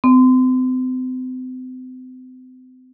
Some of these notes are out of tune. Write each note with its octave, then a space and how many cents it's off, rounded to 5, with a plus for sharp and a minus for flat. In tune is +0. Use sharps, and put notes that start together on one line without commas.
C4 -40